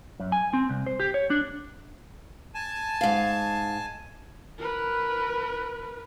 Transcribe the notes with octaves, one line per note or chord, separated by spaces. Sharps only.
F#2
G#5
C4
C2
C5
G4
C#5
D4
G#5 A5
G#2 F5
A#4 B4